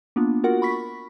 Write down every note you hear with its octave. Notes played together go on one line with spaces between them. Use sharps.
A#3 B3 D4 F4
F4 F#4 A#4 F#5
B5 C#6 B6